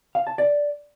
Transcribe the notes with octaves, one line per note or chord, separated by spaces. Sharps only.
F5
A5
D5